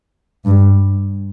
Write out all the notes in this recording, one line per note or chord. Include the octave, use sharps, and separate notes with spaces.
G2